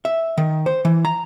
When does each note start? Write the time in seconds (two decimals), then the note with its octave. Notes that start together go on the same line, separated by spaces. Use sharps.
0.05 E5
0.38 D#3
0.66 C5
0.85 E3
1.05 A#5